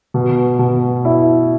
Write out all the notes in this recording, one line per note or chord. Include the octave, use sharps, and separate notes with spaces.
B2
B2
E4